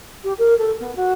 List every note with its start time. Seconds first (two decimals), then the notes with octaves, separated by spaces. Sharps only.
0.23 G4
0.38 A#4
0.58 A4
0.80 B3
0.95 F#4